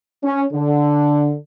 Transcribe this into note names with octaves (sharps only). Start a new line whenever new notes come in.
C#4
D3